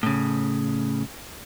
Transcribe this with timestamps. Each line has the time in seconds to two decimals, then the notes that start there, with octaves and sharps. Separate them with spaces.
0.03 A2 C#3